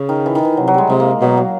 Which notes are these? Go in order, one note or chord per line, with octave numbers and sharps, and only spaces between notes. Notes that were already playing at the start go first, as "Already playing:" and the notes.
Already playing: C#3
D#3
E3
D#3
E3
C3 F#3
F#3
G3 G#3
C3 G#3
A#3
G#3
B2 F#3
F#3